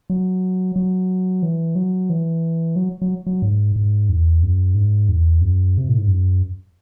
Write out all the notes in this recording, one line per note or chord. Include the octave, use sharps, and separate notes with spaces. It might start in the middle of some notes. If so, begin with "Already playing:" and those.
F#3
F#3
E3
F#3
E3
F#3
F#3
F#3
G#2
G#2
E2
F#2
G#2
E2
F#2
C3
A2
G#2
F#2